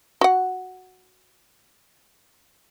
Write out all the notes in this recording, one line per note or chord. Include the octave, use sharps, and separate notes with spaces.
F#4 F#5